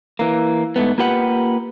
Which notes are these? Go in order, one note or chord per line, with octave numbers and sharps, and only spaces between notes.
E3 A#3
G#2 A3 B3
A#3 F4 G4 B4 F#5